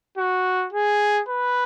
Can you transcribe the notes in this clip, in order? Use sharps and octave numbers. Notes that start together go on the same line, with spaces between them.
F#4
G#4
B4